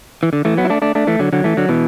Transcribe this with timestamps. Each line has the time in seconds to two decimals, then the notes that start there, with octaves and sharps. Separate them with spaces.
0.23 E3
0.33 D3
0.45 E3 A3
0.57 F#3 B3
0.65 E4
0.70 A3 D4
0.82 A3 D4
0.95 A3 D4
1.07 E3 A3
1.19 D3 F#3
1.33 D3 F#3
1.44 E3 A3
1.57 D3 F#3
1.69 B2 E3